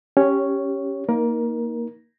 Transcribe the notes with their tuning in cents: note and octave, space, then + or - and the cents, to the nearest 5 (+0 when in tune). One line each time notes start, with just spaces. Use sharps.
C#4 +0 G4 +0 C#5 +0
A#3 +0 D#4 +15 A#4 +20